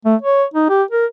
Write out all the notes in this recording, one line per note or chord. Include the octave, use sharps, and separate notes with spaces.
A3
C#5
D#4
G4
A#4